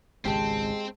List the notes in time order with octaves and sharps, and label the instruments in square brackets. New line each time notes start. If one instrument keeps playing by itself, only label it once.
[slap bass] G#1 C#2 B2 [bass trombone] G#3 [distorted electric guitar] C4 [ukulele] G4 A5